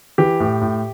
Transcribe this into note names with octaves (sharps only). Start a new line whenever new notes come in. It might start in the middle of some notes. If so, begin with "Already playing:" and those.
E3 G4
A2
A2